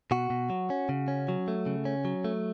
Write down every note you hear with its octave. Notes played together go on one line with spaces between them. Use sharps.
B2 F#4
B2
F#3
C#4
C#3
C#4
F#3
A3
C#3
C#4
F#3
A3